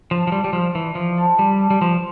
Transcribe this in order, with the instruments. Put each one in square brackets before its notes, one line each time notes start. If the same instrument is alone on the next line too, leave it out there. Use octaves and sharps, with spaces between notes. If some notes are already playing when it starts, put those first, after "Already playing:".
[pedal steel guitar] F3 [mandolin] D4
[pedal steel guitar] F3
[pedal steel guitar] G3 [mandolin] D4
[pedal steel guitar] G3
[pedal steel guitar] F3 [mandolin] D4
[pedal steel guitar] E3 [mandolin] D5
[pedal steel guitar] F3 [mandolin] D4
[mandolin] A4
[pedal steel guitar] G3 [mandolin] D4
[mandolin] A4
[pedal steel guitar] G3
[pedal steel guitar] F3 [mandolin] B4